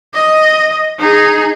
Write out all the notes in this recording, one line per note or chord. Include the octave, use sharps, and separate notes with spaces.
D#5
D#4 G#4